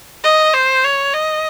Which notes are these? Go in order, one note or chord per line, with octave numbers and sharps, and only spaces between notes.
D#5
C5
C#5
D#5